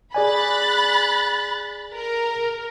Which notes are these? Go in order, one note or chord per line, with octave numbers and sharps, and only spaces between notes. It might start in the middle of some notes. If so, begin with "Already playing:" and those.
G#4 D5 G#5 B5 F#6 A6
A#4